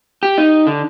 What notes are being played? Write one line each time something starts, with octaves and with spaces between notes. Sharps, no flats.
G4
D#4
D3